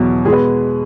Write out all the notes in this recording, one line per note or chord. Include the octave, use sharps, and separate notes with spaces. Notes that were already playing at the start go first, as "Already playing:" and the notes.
Already playing: E2 B2 F#3
B2 G#3 G#4
B4